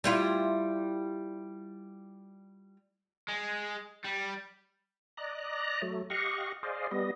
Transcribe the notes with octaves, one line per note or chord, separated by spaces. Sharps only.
G3 E4 F4
G#3
G3
D5 D#5 A#5 F#6
F#3 A3
G4 D#5 F5 F#5 C#6
G#4 C5 D5 D#5 F5
G3 B3 D#5